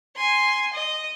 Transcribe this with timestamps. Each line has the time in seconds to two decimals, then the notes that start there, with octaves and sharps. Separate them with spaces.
0.16 G#5 C6
0.73 D#5